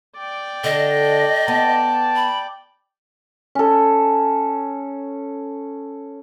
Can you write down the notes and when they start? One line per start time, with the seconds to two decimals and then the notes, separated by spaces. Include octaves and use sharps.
0.17 D5 G5
0.64 D3 D#5
1.48 B3 A5
2.16 B5
3.55 C#4 A4